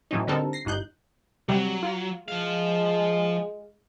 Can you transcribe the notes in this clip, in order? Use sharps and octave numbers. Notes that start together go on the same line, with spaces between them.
A2 E3 F#3 C#4 D#4
D3 G3 C4 D#4 A4 A#4
A#6 C7
G1 G2 D#4 F#6 G6
C3 F#3 G3
F4
F3 G#3 F5